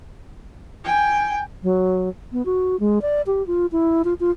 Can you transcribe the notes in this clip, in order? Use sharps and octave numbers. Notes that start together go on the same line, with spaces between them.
G5 G#5
F#3
B3
F#4
G#3
D5
G4
F4
E4
F4
F4